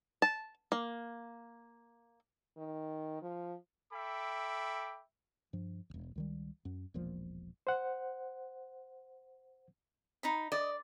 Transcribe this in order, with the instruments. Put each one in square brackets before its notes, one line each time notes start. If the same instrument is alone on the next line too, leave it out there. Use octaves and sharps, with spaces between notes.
[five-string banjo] A5
A#3
[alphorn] D#3
F3
[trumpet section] A4 E5 G5 B5 D6
[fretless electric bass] G2 F3
E1 B1
C#2 D#3 G3
F#2
E1 A#1 A#2 F3
[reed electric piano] C5 F#5
[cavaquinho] D#4 A#5 B5
[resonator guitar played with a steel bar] D5 [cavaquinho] D#5